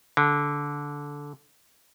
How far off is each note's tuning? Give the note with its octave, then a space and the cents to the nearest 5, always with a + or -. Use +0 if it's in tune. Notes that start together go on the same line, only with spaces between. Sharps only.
D3 -15